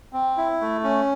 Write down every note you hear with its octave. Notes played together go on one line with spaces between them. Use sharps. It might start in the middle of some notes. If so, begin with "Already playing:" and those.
C4
E4
A3
C#4